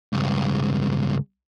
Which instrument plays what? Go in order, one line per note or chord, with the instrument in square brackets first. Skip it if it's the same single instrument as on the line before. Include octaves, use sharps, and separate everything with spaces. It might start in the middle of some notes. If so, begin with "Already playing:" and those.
[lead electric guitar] C#2 G2